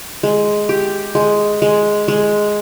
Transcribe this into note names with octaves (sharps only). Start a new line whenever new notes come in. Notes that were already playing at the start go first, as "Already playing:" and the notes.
G#3
G4
G#3
G#3
G#3